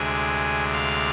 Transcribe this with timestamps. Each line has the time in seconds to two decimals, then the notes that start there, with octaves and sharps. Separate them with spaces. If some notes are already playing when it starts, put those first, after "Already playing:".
Already playing: D2 C3 G#3 D4 G#5
0.73 F5